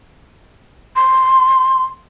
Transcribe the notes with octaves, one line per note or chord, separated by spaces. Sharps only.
C6